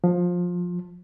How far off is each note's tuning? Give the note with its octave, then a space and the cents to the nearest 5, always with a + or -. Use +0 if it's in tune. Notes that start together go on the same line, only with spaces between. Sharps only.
F3 +20